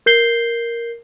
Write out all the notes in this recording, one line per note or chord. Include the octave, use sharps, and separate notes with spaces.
A#4 G6 C7 G7